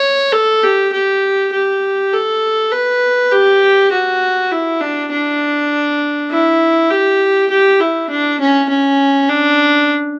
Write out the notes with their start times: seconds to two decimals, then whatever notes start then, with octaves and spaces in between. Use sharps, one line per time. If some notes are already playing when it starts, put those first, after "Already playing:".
Already playing: C#5
0.32 A4
0.63 G4
0.93 G4
1.53 G4
2.13 A4
2.72 B4
3.32 G4
3.92 F#4
4.52 E4
4.81 D4
5.11 D4
6.31 E4
6.90 G4
7.50 G4
7.80 E4
8.10 D4
8.40 C#4
8.70 C#4
9.29 D4